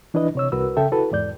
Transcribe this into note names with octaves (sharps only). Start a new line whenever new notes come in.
E3 D4 E4 B4 D#5
C3 C#5 E6
C2 F#4 A#4 B4 E6
C#3 A4 E5 G5
E4 F#4 A4 B4
E2 G#2 D5 G6